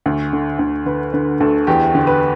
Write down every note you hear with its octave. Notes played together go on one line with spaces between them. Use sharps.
D2
D3
D2
D3 B4
D3 B4
D2 A4
E2 G4
D3
B4